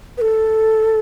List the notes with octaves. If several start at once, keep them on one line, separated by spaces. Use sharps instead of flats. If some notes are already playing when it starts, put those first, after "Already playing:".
B4
A4